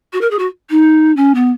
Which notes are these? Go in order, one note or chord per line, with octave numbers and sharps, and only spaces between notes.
F#4
A#4
G#4
F#4
D#4
C#4
B3